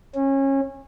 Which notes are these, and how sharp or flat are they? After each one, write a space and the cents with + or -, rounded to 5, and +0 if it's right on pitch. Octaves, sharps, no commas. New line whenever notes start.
C#4 -25